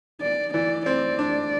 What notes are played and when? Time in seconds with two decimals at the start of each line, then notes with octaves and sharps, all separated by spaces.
0.22 D5
0.54 E3 D5
0.86 C4 D5
1.19 D4